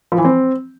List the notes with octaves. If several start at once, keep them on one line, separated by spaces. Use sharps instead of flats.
F3
E3
C4